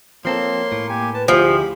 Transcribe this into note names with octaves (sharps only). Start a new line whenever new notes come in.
F3 A#3 C4 A4 C#5 C6
A2
A#3 G4 G#5
B4 A5
D2 F3 E4 G4 G#4 B5